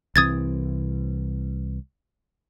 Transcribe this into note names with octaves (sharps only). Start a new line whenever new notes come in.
C2 E3 C4 D#6 G#6 A6